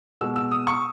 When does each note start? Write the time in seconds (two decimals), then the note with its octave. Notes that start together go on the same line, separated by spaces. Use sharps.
0.21 B2 G#3 E6
0.36 E6
0.51 D#6
0.67 C#6